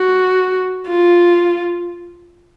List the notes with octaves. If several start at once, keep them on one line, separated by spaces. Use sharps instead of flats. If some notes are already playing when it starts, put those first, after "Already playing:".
Already playing: F#4
F4